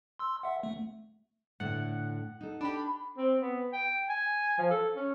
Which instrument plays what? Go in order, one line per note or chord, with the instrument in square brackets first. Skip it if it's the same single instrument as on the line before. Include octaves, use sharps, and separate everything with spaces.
[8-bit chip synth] C6 E6
E5 F#5
A3
[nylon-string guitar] A2 D3 [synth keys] F#5
[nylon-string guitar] D#4 A4
[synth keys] D4 G4 [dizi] B5
[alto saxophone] C4
B3
G5
G#5
F3
A4
C#4